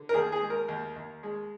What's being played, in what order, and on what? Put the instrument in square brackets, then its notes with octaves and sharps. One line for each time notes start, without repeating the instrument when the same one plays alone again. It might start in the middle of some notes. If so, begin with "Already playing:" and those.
Already playing: [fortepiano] D3
A#4
D#2 G#4
G#4
G#3
A#4
D#2
D#2
G#3